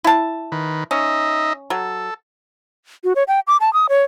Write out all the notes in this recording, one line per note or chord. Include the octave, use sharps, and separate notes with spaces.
E4 A5
D#3 B4
C#4 D#4 D#5 E5
F#3 A4
F#4
C#5
G5
D6
A5
D#6
C#5